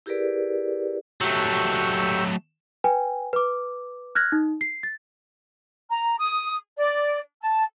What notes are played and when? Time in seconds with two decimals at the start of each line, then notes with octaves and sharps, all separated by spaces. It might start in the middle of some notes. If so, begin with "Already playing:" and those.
0.06 E4 G4 G#4 A#4 B4 D5
1.21 F#3 A3 G4 C#6 E6
2.84 B4 G5 G#5
3.33 B4 D6
4.15 F6 F#6 G#6 A#6
4.32 D#4
4.61 C7
4.83 A6
5.89 A#5
6.19 D#6
6.78 D5
7.42 A5